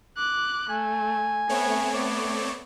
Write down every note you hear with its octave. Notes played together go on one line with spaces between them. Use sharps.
D6 F#6
A3 G#5
A3 B3 C4 C#5
B3 D5